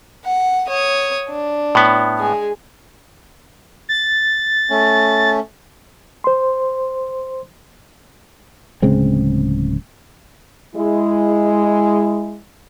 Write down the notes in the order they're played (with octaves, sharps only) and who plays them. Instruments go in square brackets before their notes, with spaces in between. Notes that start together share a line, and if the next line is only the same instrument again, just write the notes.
[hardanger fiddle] F#5
C#5 D#6
D4
[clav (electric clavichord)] A2 B3
[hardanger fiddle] G#3 G#4
[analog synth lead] A6
[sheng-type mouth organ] A3 C#4
[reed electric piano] C5 C6
[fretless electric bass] D1 C#3 G#3 C4
[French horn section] G#3 E4